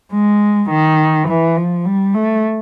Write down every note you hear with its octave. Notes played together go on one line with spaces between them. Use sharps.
G#3
D#3
E3
F3
G3
A3